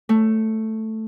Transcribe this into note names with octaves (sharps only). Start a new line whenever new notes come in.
A3